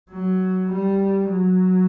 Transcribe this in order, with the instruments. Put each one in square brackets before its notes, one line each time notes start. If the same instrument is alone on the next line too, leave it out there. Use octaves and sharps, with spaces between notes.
[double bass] F#3
G3
F#3